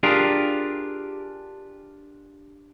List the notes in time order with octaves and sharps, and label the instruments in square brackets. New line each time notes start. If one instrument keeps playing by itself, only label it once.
[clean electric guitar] D4 F4 G4 G#4 A#4